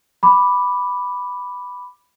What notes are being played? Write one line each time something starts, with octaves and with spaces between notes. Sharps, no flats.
B5 D6